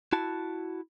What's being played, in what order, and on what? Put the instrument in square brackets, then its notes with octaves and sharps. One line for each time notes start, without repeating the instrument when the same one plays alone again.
[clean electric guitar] E4 F#4 A5